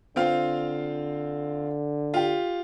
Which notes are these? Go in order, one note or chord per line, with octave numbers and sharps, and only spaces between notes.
D3 C4 F4 F5
F4 G4